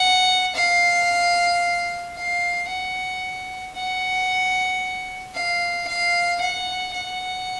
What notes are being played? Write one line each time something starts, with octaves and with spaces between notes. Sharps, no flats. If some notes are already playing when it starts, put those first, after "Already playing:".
Already playing: F#5
F5
F5
F#5
F#5
F5
F5
F#5
F#5